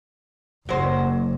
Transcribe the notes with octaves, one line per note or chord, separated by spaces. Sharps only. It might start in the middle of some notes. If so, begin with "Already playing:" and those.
F#1 F#2 F#3 C5